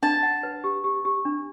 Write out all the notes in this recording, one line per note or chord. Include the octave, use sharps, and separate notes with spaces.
D4 A5
F#5
B4
G4
G4
G4
D4